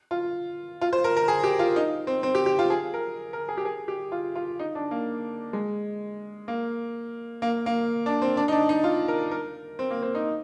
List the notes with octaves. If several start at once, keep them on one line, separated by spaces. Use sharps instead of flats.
F4
F4
C5
A#4
A#4
G#4
G4
F4
D#4
C4
C4
G4
G4
F4
G#4
A#4
A#4
G#4
G4
G#4
G4
F4
F4
D#4
D4
A#3
G#3
A#3
A#3
A#3
D4
C4
D4
D#4
D4
D#4
F4
A#4
A#4
C4
A#3
C4
D#4